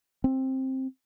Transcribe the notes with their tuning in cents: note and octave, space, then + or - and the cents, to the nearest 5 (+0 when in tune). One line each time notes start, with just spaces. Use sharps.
C4 +10